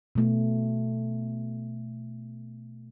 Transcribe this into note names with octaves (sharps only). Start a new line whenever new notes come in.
B2 A3